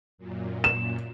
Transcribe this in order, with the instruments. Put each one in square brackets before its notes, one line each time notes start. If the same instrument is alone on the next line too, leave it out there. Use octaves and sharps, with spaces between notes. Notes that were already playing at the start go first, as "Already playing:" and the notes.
[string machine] F#2 A#2
[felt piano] E7